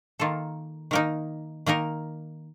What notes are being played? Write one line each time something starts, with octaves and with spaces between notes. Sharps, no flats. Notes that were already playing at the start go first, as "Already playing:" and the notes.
D#3 A#3 F4 A4
D#3 A#3 D#4 A#4
D#3 A#3 D#4 A#4